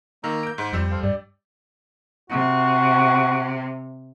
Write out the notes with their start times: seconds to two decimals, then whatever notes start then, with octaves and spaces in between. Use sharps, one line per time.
0.24 D#3 A#3 A#5 E6
0.43 G6 D7
0.58 G#2 C5
0.73 F2 G3 E6 E7
0.91 A4 C5 F5
1.03 G2 D5
2.30 C3 F#4